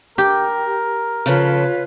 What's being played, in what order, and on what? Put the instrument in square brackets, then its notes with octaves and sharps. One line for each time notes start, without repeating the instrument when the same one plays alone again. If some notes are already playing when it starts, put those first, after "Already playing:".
[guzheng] G4 [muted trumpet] A#4
[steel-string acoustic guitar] C#3 F3 A4 [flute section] F4 B4 C#5